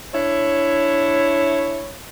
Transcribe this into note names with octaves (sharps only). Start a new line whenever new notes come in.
D4 E4 C#5